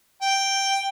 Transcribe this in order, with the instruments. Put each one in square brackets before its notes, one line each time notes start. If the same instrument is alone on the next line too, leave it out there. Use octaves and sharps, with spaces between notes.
[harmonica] G5